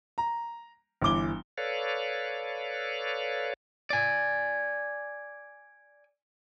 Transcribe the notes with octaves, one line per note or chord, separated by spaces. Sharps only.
A#5
G1 E3 D6 G7
A4 B4 C#5 D5 F5
D5 G#5